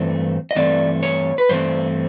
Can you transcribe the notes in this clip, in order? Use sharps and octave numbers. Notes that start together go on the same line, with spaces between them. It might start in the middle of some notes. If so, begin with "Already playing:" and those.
Already playing: G2 E3 A3 C4
D#5
G2 E3 A3 C4 D5
C#5
B4
G2 E3 A3 C4 C5